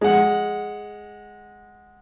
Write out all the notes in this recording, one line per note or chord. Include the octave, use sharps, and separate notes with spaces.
G#3 F#5